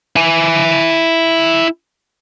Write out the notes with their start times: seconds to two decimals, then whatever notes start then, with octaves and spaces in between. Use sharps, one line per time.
0.16 E4 G#5